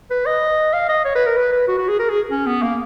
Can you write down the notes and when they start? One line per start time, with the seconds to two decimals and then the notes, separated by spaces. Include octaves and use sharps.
0.10 B4
0.26 D#5
0.73 F5
0.89 D#5
1.05 C#5
1.15 B4
1.26 A#4
1.37 B4
1.52 B4
1.68 F#4
1.78 F#4
1.89 G#4
1.99 A#4
2.10 G#4
2.31 C#4
2.46 B3
2.62 A#3